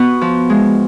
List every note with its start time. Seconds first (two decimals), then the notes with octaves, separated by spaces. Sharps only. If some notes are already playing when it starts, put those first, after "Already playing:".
Already playing: B3 F#4
0.21 F3
0.50 G#3